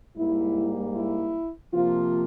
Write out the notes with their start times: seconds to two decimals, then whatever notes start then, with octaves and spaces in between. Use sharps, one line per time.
0.16 G#2 G3 A#3 E4
0.95 E4
1.74 C3 F3 A#3 F4